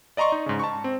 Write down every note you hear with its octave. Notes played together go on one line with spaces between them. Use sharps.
D5 D#5 A#5 C6 C#6
D#4
G#2 C#3
A5 C#6
C4